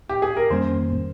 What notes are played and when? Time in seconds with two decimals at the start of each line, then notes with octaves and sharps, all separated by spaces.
0.09 G4
0.22 G#4
0.37 A#4
0.50 F2 D#3 G3 A#3 C#4 C5